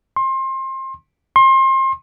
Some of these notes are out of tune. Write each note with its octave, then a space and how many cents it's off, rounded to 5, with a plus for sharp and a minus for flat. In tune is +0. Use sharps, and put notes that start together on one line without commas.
C6 +25
C6 +30